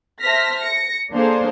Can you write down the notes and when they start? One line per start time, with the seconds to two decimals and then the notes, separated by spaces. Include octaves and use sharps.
0.21 C5 E5 A5 F6 A#6 B6
0.59 A#6 C#7
1.12 A#3 D4 G#4 A4 C5 F5